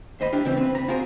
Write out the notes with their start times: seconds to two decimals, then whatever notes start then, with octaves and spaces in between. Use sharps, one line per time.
0.20 D#2 C5 D#5 B5
0.32 D4 E4 G4 A#4
0.45 C#3 E3 G3 C4
0.57 C4 B4
0.75 A#5 B5
0.88 C4 F4 F#4 G#4 A#4 C5